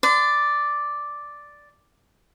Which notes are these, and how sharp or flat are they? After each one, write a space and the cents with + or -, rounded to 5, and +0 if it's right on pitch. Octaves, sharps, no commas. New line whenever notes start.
D5 +0 C6 -40